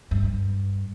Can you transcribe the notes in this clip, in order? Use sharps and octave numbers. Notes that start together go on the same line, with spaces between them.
G2